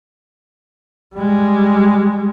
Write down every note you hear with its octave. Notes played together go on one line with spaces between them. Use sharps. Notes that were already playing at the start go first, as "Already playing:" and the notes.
G3 G#3